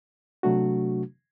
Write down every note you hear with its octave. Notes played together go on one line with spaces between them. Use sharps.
C3 F#3 A3 D4 F#4